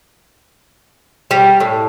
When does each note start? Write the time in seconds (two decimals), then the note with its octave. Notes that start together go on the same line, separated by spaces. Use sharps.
1.31 G3
1.60 A2